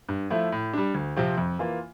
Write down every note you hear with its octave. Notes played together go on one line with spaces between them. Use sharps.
G2
F3 A3 E4
A2
G3 D4
D2
C3 F3 C4
F2
E3 A#3 F4